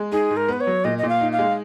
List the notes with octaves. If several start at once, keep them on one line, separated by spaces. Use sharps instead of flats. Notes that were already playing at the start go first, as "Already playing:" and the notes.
Already playing: G#3
D#4 G#4
G#2
A#4
B3 B4
C#5
F#3
A#2 D#5
A#2 D#5
F5
D#4
F5
G#3